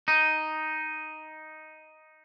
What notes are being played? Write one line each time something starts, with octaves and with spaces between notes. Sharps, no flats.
D#4